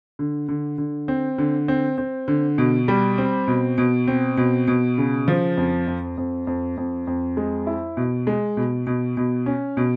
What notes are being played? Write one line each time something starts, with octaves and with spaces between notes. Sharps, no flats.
D3
D3
D3
C4
D3
C4
C4
D3
B2
G3
C4
B2
B2
C4
B2
B2
C#3
F3
F2
F2
F2
F2
F2
F2
G#3
E4
B2
G#3
B2
B2
B2
C#4
B2